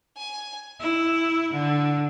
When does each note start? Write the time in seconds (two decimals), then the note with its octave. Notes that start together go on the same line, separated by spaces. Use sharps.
0.17 G#5
0.79 E4
1.51 D3